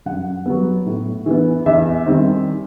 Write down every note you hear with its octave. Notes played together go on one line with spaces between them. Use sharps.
F#2 F#5
F#3 B3
A2
E3 B3
E2 E5
D#3 G3 C4